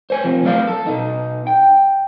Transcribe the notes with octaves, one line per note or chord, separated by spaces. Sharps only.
C5 C#5 G#5
C3 F3
F#3 A3 B3 A4 D#5 F5
A4
B2 D#4
G5